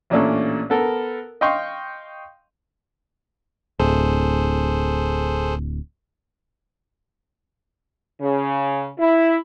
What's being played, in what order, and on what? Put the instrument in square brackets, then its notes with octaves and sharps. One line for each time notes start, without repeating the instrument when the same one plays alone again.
[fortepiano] A1 A#2 C#4 D4 A4
B3 A4 A#4
D#5 F5 G5 C6 C#6
[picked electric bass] D1 [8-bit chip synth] G#4 A4 C5
[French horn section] C#3
E4